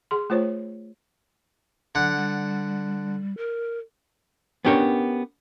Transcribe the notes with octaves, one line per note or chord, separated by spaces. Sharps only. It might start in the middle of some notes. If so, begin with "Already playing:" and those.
G#4 C6
A3 F4 C5 C#5
D3 F#3 F#5
G3
A#4
B3 C#4 D4 G4 A#4 C#5